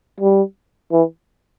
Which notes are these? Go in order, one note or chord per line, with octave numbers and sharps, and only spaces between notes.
G3
E3